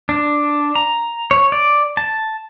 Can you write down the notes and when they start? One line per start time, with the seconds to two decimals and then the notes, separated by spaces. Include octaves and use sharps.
0.09 D4
0.75 A#5
1.31 C#5
1.52 D5
1.97 A5